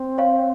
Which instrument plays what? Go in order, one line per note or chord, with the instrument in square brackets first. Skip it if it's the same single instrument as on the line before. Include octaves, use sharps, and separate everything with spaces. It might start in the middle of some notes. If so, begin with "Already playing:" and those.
Already playing: [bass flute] C4
[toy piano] C#5 F5